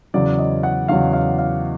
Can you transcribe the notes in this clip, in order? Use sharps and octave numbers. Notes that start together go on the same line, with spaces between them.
E2 C#3 F#3 D5
D#5
F#5
E2 C#3 F#3 F5
F5
F5